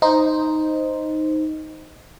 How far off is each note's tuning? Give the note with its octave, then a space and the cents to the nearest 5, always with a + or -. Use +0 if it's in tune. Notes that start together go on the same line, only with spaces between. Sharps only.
D#4 +0 C5 +0